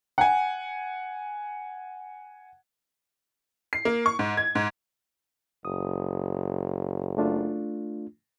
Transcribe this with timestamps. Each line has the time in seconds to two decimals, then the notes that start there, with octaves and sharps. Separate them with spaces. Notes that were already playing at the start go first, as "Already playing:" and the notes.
0.18 F#5 G#5
3.73 C7
3.85 A#3
4.06 C#6
4.19 G#2
4.37 G#6
4.55 G#2
5.65 F#1 D#6
7.18 A3 D4 F4